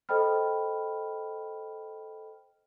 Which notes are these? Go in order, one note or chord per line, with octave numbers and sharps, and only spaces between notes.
A4 C5 D#5 G5 B5 F6